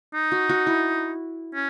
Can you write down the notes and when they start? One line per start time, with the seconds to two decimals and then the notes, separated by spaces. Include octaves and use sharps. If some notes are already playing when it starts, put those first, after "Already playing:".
0.14 D#4
0.32 F#4
0.49 F#4
0.67 E4
1.55 C#4